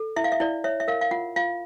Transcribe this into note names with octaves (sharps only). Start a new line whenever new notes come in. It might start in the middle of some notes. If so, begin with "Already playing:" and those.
Already playing: A4
E4 E5
F5
E5
E4 D5
C#5 E5
E5
A#4 F5
F5
F4 F#5
F4 F5